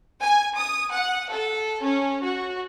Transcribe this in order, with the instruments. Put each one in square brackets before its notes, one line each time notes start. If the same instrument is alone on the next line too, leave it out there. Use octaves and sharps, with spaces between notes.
[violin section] G#5
D#6
F#5
A4
C#4
F#4